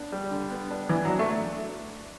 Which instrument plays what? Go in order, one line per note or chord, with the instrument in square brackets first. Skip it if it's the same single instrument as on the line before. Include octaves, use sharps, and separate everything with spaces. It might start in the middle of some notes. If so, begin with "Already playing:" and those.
Already playing: [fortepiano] B3 D4
G3
D3
B3
D4
[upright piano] E3 [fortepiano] B3
[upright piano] F#3
[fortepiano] D4
[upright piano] A3